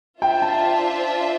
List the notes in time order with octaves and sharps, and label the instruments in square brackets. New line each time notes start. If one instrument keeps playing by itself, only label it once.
[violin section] D4 F4 C5 E5 [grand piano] G5
[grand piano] A5